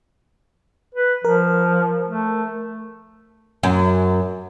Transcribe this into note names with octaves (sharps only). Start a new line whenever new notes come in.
B4
F3 A#4
A3
F#2